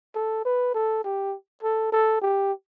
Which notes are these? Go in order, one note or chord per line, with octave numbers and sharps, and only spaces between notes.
A4
B4
A4
G4
A4
A4
G4